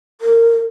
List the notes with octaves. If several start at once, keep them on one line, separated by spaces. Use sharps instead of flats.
A#4